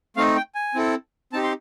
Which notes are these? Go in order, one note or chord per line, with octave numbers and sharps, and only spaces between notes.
A3 C4 D#4 F5
G5
G#5
C4 E4 A4
C4 D#4 G4 A5
C6